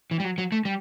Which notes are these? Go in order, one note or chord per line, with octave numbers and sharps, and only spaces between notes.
E3
G3
F#3
F#3
A3
G3